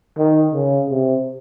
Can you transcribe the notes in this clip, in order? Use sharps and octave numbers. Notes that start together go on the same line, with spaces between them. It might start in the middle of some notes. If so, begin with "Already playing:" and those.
D#3
C#3
C3